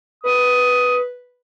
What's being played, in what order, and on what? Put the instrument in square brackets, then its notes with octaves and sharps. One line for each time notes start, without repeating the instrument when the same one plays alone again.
[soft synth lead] B4 [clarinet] D#6